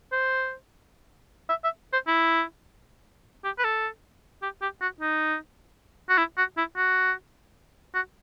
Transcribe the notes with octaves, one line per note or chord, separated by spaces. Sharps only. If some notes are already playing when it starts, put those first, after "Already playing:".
C5
E5
E5
C5
E4
G4
B4
A4
G4
G4
F#4
D#4
F#4
E4
F#4
E4
F#4
F#4